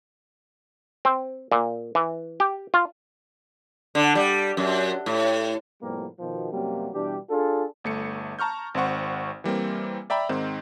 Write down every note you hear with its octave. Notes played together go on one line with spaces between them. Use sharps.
C4
A#2
E3
G4
F4
D3
G3
F#2
A2
A2 C3 F3 G3 A#3 B3
B2 D#3 F3
F#2 C3 F#3 G3 A#3
B2 E3 G3 D4 G4
D4 F4 G#4 A4
G1 A3 C#7
A5 A#5 C#6 F6 G6
G#1 C4 C5 F#5 C#6
E3 G3 A#3 C4
D5 E5 G5 A#5 B5
G#2 D#3 C4 D#4